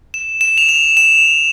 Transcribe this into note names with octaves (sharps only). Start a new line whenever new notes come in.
E7
E7
F7
E7
E7